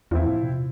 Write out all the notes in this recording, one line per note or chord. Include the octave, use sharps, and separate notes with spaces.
E2 F3 C4 E4
A#2
C3